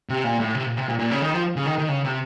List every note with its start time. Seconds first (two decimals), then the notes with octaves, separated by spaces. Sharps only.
0.09 C3
0.24 A#2
0.39 A2
0.55 C3
0.66 A#2
0.77 C3
0.88 A#2
0.99 A#2
1.11 C#3
1.22 D#3
1.33 F3
1.56 C#3
1.66 D#3
1.78 D#3
1.89 C#3
2.04 C3